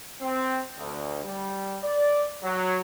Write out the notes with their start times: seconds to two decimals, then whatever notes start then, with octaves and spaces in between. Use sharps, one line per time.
0.22 C4
0.78 D2
1.24 G3
1.83 D5
2.43 F#3